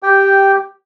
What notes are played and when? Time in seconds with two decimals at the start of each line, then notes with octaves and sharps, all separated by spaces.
0.03 G4 G5